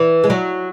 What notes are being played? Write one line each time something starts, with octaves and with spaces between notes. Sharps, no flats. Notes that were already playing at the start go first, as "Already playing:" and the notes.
Already playing: E3
G#3
F#3